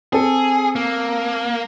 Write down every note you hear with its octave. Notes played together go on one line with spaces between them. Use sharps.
C4 G#4 A4
A#3